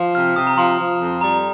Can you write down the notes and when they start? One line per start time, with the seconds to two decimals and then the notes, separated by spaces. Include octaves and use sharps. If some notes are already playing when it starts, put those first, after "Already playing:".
Already playing: F3
0.14 C3 F6
0.36 C3 D#6
0.47 A#5
0.57 F3 C6
0.79 F3
1.00 F2
1.21 G3 A#5